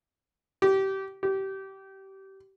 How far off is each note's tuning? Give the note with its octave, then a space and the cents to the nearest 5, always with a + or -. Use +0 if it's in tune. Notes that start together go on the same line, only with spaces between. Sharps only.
G4 -25
G4 -25